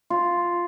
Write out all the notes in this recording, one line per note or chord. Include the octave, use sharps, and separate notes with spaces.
F4